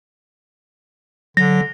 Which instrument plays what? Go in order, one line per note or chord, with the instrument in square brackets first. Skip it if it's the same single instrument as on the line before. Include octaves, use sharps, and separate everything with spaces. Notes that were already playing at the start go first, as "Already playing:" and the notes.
[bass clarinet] D3 [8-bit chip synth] F#3 [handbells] A#6